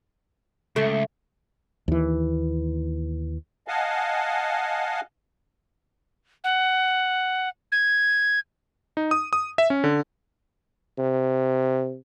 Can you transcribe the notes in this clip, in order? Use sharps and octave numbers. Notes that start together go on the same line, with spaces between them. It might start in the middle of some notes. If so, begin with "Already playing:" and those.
C#2 A3
D#2 E3
D#5 F5 F#5 G#5 A5
F#5
G#6
D#4
D#6
D#6
E5
C#4
D3
C3